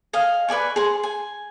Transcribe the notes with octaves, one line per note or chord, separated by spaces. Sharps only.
D#5 F5 G#5
B4 D5 G#5 C#6
G#4 C5
G#5